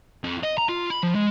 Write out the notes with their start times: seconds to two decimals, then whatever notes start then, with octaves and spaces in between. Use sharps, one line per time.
0.24 F2
0.43 D#5
0.58 A#5
0.69 F4
0.90 B5
1.03 F3
1.15 G#3